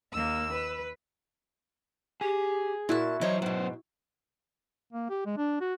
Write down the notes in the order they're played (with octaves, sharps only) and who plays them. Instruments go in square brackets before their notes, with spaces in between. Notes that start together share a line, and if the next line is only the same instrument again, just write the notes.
[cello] D#2 A#3 [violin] E6
[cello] B4
[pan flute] G4 [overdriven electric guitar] G#4
[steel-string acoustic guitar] A#2 A5 [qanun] E4 F#4 [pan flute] A#4
[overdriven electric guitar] E3 C5 [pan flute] F#3 [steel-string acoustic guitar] D#4 C#5
[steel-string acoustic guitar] G#2 B2 [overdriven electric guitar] B3 C5
[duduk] A#3
G4
G#3
D4
F#4